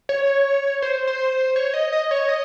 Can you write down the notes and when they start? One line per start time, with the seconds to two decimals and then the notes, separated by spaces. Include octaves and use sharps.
0.09 C#5
0.82 C5
1.07 C5
1.56 C#5
1.74 D#5
1.93 D#5
2.11 C#5
2.29 D#5